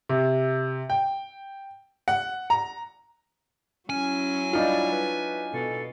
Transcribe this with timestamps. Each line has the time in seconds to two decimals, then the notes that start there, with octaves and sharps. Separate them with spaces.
0.09 C3
0.90 G5
2.08 F#5
2.50 A#5
3.90 F#3 C#4 E4 G#5
4.53 G3 D4 D#4 F4
4.92 B4
5.53 B2 A4